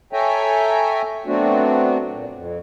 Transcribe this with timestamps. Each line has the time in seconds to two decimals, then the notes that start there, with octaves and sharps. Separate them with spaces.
0.13 A4 C#5 E5 G5 G#5 A#5
1.26 F#3 A3 B3 C4 D4 F#4
2.08 A#2
2.33 F2